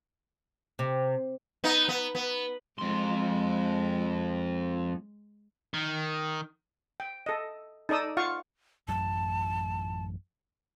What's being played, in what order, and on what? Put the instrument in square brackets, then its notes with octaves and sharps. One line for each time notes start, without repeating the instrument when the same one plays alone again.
[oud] C3
[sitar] B3 D#4
B3
B3
[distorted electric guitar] F2 C6 [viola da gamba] G#3
[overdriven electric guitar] D#3
[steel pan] G5
A4 D#5
D#4 A4 D5 D#6 E6
F4 F5 F#5 C#6
[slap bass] A1 F#2 F#3 [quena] A5